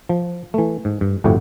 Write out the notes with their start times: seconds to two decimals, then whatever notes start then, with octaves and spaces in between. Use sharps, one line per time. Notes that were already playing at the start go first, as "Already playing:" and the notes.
0.09 F3
0.54 E3 A3
0.85 G#2
1.01 G2
1.24 G1 F2 A2 E4 F#4 G4